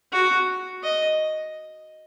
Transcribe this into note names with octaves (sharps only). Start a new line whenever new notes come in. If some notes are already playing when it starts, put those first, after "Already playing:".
F#4
D#5